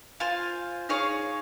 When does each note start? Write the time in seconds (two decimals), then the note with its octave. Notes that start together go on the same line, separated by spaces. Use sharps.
0.20 F4 C5 F5 G#5
0.89 D#4 G#4 C#5 F5